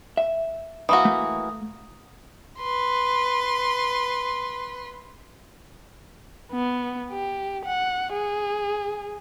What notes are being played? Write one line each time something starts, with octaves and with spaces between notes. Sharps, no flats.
E5
E3 A#3 F#4 D#6
A3
B4 C6
B3
G4
F#5
G#4